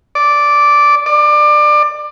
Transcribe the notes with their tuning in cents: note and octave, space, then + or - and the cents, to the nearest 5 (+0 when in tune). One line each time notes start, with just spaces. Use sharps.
D5 -5
D5 +25